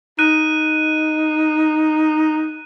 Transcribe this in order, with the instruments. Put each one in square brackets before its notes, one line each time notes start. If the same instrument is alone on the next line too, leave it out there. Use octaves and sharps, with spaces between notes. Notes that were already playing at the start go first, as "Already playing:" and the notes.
[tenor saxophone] D#4 [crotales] F#6 D#7